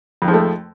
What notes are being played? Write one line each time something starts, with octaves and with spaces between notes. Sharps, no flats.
F2 D#3 F3 G#3 A3